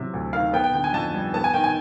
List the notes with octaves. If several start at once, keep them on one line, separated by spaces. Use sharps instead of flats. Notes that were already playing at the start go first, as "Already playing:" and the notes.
Already playing: C3 E3 F#3 E5
D2
D#3 F5
B3 G5
G5
D3 G5
G#5
F2 A5
G3
B3 A5
G#5
D#3 G5
G#5